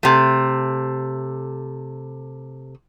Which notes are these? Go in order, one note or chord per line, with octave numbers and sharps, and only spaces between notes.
C3 A3